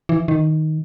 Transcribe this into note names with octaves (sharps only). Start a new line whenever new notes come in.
E3
D#3